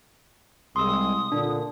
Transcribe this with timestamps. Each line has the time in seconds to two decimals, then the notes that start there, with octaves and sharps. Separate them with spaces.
0.76 C2 G#3 C6 D#6 E6
1.32 A#2 D3 D4